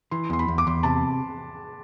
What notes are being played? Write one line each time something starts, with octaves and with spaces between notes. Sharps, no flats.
E3 C6
E2 C6
B5
E2
D6
E2 C6
C3 A5